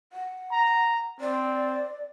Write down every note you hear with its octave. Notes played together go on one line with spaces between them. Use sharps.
F#5
A#5
C4 D5